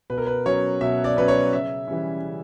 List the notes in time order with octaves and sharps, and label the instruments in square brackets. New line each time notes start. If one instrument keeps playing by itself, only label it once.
[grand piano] B2 B4
A#4
B4
F#3 C#4 C#5
B2 E5
D5
F#3 C#4 B4
C#5
C#3 E5
E3 G3 C#4
C#3